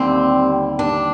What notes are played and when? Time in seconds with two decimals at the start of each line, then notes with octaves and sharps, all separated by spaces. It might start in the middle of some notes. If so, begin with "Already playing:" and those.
Already playing: D#2 D3 G3 C4
0.79 D4